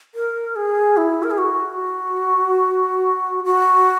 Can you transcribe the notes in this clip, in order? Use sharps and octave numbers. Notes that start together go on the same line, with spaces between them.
A#4
G#4
E4
A#4
G#4
F#4
F#4